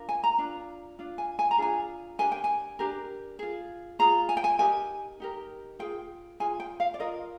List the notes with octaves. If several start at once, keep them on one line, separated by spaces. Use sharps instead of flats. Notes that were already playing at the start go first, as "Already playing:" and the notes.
Already playing: D4 F4 A#4
G#5
A#5
D4 F4
D4 F4
G#5
G#5
A#5
D4 F4 G#4 G#5
D4 G4 A#4 G#5
G5
G#5
D4 G4 A#4
F4 G#4
F4 G#4 A#5
G#5
G5
G#5
D#4 G4 A#4 G#5
D#4 G4 A#4
F4 G#4 G5
F4 G#4 G#5
G5
F5
D5
F4 A#4 D#5